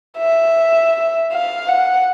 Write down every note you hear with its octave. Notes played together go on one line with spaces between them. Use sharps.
E5
F5
F#5